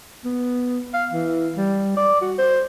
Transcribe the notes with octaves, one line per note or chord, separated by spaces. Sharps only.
B3
F5
E3
G3
D5
F#4
C5